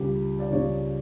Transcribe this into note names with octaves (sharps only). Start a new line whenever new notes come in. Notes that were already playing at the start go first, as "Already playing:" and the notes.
Already playing: C#2 C#3 G3 G4
D5
C#2 C#3 G3 C#5